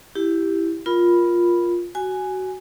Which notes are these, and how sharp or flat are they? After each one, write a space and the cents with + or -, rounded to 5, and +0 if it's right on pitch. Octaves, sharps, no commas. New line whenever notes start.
E4 +0 G4 +0
F4 +0 A#4 +20 B5 +0
F#4 +15 G#5 +0